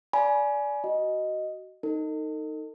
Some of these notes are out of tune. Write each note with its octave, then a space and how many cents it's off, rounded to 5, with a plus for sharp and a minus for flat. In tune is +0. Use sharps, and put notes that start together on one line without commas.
D5 -15 G#5 +20 B5 -30
F#4 +20 D#5 +0
D#4 +0 A4 +40